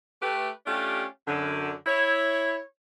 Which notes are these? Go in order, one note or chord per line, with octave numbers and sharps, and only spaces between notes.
A3 G4 B4
A3 C#4 D4 F4 G4
F#2 D3
E4 C#5